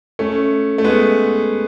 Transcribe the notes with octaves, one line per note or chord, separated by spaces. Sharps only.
A3 C#4
A3
G#3 B3